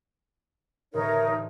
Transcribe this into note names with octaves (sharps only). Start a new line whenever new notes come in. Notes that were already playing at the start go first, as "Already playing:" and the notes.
A1 A2 D3 D#4 A#4 C#5